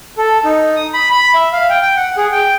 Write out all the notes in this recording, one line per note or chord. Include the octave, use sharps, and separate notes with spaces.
A4
D#4
D#6
B5
B5
E5
F5
G5
G5
F#5
G#4
G5